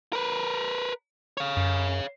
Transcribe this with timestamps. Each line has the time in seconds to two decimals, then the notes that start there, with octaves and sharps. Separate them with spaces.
0.13 A#4 B4
1.37 C#5 F5
1.57 F#2